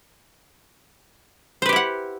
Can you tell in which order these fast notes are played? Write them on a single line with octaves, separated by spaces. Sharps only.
C5 B4 G4 E4 F#5